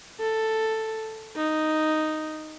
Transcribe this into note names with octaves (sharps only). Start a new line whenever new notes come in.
A4
D#4